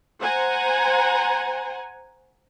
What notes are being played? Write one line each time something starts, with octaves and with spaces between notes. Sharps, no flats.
C5 F#5 G#5 A#5